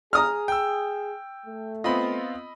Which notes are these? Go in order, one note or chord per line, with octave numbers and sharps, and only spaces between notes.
G#4 A#5 D#6 F6
G5 E6
A3
B3 C4 F4 D#5 B5